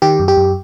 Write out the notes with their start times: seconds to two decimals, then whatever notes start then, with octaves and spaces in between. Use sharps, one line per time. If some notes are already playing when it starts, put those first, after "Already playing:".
0.02 D#3 G4
0.19 F#2
0.28 G4
0.37 F#2